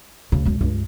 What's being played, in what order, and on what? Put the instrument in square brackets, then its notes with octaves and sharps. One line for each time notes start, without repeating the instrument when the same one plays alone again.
[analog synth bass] D2 [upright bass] C#3
[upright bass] F#2 G#3
[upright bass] C#2 [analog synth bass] G2